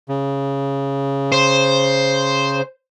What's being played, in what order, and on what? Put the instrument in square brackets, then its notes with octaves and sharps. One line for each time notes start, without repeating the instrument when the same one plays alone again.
[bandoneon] C#3
[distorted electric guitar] C5